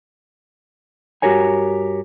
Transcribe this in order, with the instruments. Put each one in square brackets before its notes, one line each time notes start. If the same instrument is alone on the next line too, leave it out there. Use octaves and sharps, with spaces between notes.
[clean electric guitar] G2 F#4 G4 A#4 C#5 G#5